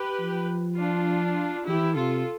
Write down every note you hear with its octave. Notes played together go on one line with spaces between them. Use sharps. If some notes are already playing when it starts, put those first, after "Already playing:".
Already playing: G4 B4
F3
D4 F4
E3 E4 G4
C3 F4 A4